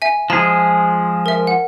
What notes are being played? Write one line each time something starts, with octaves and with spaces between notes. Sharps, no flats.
E5 G#5
F3 G#3 G#4 A#5
A#4 E5
F#5